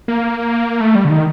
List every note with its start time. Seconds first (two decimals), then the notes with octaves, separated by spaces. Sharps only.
0.08 A#3
0.80 A3
0.95 G3
1.05 D3
1.10 D#3